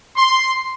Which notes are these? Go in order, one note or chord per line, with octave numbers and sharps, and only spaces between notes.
C6